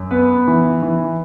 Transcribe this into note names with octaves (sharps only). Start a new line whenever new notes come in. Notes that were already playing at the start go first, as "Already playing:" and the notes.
Already playing: F#2
B3 B4
E3
E3